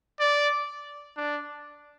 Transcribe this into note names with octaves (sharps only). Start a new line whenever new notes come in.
D5
D4